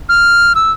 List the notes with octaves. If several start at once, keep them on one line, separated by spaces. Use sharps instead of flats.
F6
E6